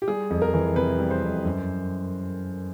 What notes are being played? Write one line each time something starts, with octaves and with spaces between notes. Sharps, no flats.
G4
G3 G#4
F2
A#4
E3
C3 B4
G3
C5
F2
F#2